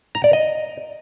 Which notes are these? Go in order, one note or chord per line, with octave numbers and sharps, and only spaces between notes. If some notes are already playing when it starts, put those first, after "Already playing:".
A#5
D5
D#5